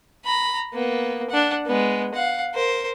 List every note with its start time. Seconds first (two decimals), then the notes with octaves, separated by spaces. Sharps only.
0.25 A#5 B5
0.73 A#3 B3
1.30 D4 F#5
1.66 G#3 B3
2.14 F5 F#5
2.54 A#4 C5